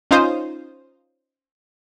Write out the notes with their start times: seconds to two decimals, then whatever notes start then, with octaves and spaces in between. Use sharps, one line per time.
0.11 C#4 D#4 F4 C5 D#6